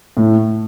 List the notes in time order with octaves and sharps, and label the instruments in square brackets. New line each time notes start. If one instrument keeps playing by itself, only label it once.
[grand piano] A2